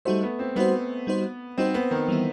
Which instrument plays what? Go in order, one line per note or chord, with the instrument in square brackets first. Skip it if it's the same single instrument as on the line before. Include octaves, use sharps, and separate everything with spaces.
[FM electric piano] G3 D#4 F#4 C5 [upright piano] A3
[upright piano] B3
C4
[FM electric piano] G3 D#4 F#4 C5 [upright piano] B3
[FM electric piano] G3 D#4 F#4 C5
[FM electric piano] G3 D#4 F#4 C5 [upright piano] C4
[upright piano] B3
D#3
[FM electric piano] E3 G3 B3 E4